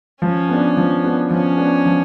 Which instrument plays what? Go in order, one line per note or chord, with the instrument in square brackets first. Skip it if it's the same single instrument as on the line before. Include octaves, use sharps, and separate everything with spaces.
[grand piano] F3 [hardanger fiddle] C#4
[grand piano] B3 D4
F3
B3 D4
[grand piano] F3 [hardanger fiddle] C#4
[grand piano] B3 D4
F3